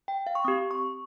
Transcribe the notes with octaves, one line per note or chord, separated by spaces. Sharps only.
G5
F5
C#6
C4 G4 D#6
C#6